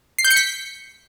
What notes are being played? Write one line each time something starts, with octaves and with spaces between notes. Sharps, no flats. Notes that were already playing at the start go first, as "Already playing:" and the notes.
C7
G6
C#7
B6